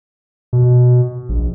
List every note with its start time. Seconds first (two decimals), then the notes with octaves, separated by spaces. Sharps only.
0.53 B2
1.29 A#1